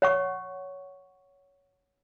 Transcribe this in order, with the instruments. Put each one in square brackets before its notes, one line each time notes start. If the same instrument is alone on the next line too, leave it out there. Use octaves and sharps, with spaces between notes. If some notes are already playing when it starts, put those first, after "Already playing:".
[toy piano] C#5 F#5 C#6